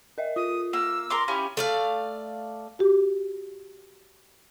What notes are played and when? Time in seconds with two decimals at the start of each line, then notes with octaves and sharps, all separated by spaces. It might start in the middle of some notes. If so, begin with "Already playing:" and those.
0.18 A#4 D#5 E5
0.36 F4 D#6
0.73 A#3 E6
1.10 A#4 C6 D6
1.28 C#4 E4 G4 F5 G#5 B5
1.57 A3 D5 F5
2.79 F#4 G4